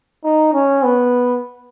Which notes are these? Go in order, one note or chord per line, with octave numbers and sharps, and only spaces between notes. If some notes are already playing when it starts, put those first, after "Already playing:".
D#4
C#4
B3